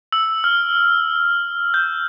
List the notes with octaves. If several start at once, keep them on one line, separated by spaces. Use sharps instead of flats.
E6
F6
G6